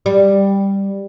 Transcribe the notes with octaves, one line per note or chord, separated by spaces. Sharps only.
G3